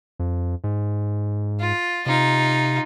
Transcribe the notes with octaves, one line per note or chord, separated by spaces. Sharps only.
F2
G#2
F4
C3 D#4 F4